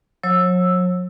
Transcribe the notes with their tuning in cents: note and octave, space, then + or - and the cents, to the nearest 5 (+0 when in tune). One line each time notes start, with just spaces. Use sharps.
F#3 -40 C#5 -40 E6 +0